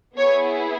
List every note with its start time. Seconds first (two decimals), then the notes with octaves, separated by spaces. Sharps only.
0.17 B3 E4 G#4 C#5